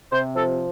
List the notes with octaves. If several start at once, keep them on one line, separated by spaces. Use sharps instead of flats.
C3 C5
F3 A4